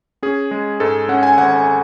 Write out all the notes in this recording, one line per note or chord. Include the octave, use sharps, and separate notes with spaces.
C#4 G#4
G#3
G#2 A4
C#4 F#5
G#5
G#1 F#5